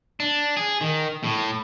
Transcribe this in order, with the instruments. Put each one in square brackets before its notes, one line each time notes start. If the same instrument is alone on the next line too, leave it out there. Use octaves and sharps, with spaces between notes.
[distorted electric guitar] D4
G#4
D#3
A2